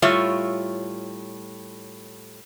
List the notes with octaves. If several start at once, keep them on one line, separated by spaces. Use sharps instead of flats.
A2 G3 F4 C#5 E5